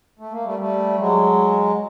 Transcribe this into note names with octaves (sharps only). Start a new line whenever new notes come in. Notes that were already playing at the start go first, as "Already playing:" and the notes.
A3
A#3
G3 A3
G3 A3
F#3 G#3